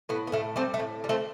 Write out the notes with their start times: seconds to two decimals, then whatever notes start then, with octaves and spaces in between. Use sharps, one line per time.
0.09 A2 B3
0.27 B3
0.32 A2 A3
0.56 G3 A3 C4
0.74 A3
0.79 A2
1.04 G3
1.09 A3 C4